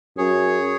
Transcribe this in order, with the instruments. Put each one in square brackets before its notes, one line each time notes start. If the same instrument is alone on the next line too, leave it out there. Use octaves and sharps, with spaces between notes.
[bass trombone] F#2 [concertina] G#4 C#5